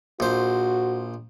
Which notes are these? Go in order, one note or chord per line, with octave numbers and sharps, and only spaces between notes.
A#1 F#4 C5